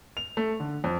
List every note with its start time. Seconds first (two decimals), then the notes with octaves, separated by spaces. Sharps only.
0.17 F7
0.37 A3
0.60 D3
0.84 F2